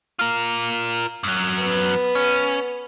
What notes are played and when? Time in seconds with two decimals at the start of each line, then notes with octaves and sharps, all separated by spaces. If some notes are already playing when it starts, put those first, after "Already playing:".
0.19 F4 A#4
1.24 F#2 F#3
1.61 B3
2.15 C#4